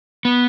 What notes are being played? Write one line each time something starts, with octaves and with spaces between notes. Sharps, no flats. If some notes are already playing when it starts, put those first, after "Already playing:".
B3